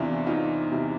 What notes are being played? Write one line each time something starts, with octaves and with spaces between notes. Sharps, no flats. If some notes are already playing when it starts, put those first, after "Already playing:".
Already playing: E2 C3 E3 C4 D4 E4 F4
E2 D#4 F4
C3 E3